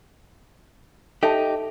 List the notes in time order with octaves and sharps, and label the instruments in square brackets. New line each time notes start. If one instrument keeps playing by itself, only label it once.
[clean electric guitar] D#4 G4 [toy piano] A4 E5 A5